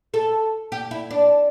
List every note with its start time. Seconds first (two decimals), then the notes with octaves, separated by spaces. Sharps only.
0.14 A4
0.72 G4
0.91 E4
1.11 D4